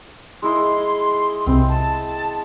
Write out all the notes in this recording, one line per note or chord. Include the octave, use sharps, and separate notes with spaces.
G#3 E4 D#5 C6
C2 C3 C4
A5